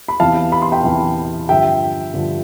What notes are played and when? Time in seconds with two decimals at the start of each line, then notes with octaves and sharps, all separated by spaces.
0.08 B5
0.20 E2 C3 E3 B3 F5 A5
0.52 B5
0.62 C6
0.72 G5 B5
0.84 E2 C3 E3 B3
1.49 G2 D3 F3 E5 G5
2.14 G2 D3 F3